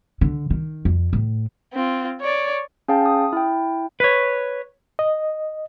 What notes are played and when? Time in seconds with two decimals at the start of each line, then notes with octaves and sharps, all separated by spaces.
0.21 D3
0.50 D#3
0.85 F2
1.13 A2
1.74 C4 F4
2.21 C#5 D5
2.88 C#4 G#4 F5 G5 A5
3.06 D#6
3.33 E4 G5
4.00 B4 C#5
4.99 D#5